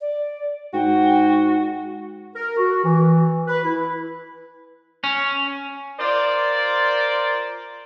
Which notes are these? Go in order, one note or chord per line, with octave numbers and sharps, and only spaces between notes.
D5
G#2 F#4 G5
A#4
F#4
E3
B4
E4
C#4
F4 A#4 C5 D5